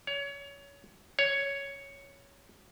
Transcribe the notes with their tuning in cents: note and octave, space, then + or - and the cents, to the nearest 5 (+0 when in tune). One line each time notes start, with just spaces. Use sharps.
C#5 +25
C#5 +5